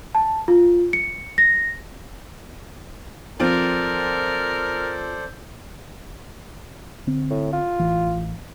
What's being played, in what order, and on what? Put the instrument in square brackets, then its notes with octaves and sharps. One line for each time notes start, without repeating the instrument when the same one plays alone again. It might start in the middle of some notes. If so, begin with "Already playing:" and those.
[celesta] A5
F4
C#7
A#6
[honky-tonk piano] F3 C4 [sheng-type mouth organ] A4 C5 D5 [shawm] A#4
[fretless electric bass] D3 C4
[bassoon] A2
F4
[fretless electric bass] A1 E3